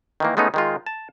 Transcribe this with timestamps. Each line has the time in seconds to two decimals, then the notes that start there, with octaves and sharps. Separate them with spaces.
0.20 D#3 E3 A#3
0.37 G#3 A3 B3 C#4 D#4
0.54 D#3 G#3 F4
0.86 A5